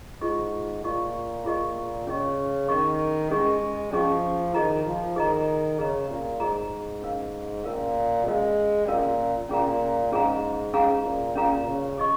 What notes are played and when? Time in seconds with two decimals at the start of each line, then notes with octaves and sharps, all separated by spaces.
0.21 G#2 F4 G#4 D#5 C#6
0.83 A#2 F4 G#4 D#5 C#6
1.45 F4 G#4 D#5 C#6
2.07 C#3 C#4 G#4 D#5 C#6
2.68 D#3 C#4 G#4 D#5 C#6
3.31 G#3 C#4 G#4 D#5 C#6
3.92 F3 C#4 G#4 D#5 C#6
4.54 D#3 G#4 D#5 A#5
4.85 F3
5.16 D#3 G#4 D#5 A#5
5.78 C#3 G#4 D#5 A#5
6.09 A#2
6.40 G#2 G#4 D#5 A#5
7.02 C#4 A#4 F5
7.64 A#2 C#4 A#4 F5
8.26 G#3 C#4 A#4 F5
8.88 A#2 C#4 A#4 F5
9.49 A#2 C#4 G#4 F5 A#5
10.12 G#2 C#4 G#4 F5 A#5
10.74 G#2 C#4 G#4 F5 A#5
11.05 A#2
11.35 A#2 C#4 G#4 F5 A#5
11.66 C#3
11.98 G#4 D#5 C#6